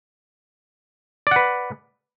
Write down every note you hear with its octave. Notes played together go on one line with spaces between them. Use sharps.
B4 D5 F#5